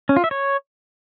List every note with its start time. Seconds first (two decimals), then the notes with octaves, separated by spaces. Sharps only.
0.09 C#4
0.16 F4
0.24 E5
0.31 C#5